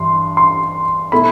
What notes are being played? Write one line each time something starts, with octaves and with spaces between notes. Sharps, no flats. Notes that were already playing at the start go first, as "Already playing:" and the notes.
Already playing: G2 E3 D4 C6
C6
B2 A3 E4 B5